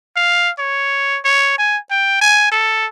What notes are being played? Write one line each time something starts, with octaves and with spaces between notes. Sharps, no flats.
F5
C#5
C#5
G#5
G5
G#5
A4